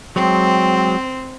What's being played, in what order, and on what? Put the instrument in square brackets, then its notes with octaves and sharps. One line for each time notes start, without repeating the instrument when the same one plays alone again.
[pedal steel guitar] F#3 G#3 [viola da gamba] C4 [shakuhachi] G5